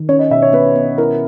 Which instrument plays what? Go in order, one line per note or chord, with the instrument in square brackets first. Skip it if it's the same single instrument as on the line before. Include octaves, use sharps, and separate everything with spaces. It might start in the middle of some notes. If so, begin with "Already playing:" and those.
Already playing: [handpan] D#3
[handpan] C#4 [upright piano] C#5
[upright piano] D#5
[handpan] B2 [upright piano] E5
[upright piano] C#5
[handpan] B3 [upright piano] B4
[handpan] B3
[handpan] E4 [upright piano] A#4